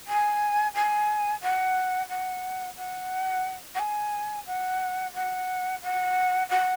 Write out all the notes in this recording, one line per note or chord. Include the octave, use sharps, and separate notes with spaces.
G#5
G#5
F#5
F#5
F#5
F#5
G#5
F#5
F#5
F#5
F#5